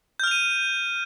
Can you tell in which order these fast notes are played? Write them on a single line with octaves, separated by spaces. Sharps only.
G6 F6 F7 D#7